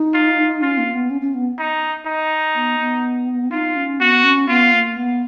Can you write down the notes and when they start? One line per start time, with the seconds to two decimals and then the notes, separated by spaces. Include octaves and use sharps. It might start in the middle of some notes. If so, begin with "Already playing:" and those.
Already playing: D#4
0.14 F4
0.62 C#4 F4
0.78 A#3
0.94 B3
1.10 C#4
1.22 C#4
1.34 B3
1.59 D#4
2.07 D#4
2.55 B3
2.79 B3
3.52 D#4 F4
3.76 C#4
4.00 B3 F#4
4.24 C#4
4.48 B3 F4
4.73 A#3
4.96 B3